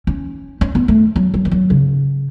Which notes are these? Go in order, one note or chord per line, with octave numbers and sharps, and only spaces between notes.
C#4
C#4
B3
A3
F#3
F#3
E3
F#3
C#3